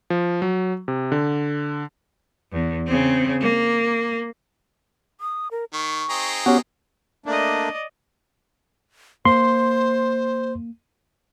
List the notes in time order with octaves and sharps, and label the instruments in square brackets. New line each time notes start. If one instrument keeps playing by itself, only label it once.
[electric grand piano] F3
F#3
C3
D3
[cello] E2
C#3 C4
A#3
[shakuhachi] D#6
A#4
[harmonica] D#3 [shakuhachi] C#6
[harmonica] C4 D#4 G#4
[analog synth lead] B3 [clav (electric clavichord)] C#4 F#4 [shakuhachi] G4
[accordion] A3 A#3 D4 [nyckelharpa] D5 D#5
[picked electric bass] A#3 [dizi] C5 [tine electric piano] C6